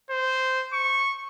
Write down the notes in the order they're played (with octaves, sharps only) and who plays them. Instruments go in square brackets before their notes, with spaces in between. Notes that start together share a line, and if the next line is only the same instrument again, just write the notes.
[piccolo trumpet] C5
C#6